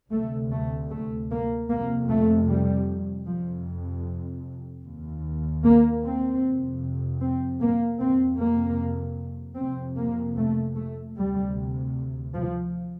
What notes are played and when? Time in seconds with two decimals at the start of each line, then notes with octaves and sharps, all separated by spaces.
0.12 D2 C3 A3
0.52 A3
0.91 A3
1.30 A#3
1.69 F2 C3 A#3
2.09 A3
2.48 G3
3.27 F2 C3 F3
4.85 D#2
5.64 A#3
6.03 C4
6.42 F2 C3
7.21 C4
7.61 A#3
8.00 F2 C3 C4
8.39 A#3
9.57 F2 C3 C4
9.97 A#3
10.36 A3
10.76 A3
11.15 D2 C3 G3
12.33 F3